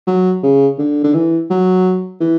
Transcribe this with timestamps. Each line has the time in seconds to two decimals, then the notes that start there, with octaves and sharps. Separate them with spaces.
0.07 F#3
0.43 C#3
0.78 D3
1.04 D3
1.14 E3
1.50 F#3
2.20 E3